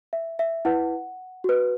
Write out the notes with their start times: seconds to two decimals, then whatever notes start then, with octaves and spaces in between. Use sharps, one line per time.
0.13 E5
0.39 E5
0.65 E4 B4 F#5
1.44 F#4 B4